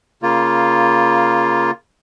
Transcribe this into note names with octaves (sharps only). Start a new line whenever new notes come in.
C#3 A#3 F4